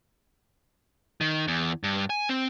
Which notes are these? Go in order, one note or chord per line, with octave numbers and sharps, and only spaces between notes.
D#3
E2
G2
G#5
C4